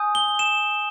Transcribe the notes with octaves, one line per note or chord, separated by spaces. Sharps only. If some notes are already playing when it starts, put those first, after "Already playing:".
Already playing: G#5 D#6 G6
G7
E7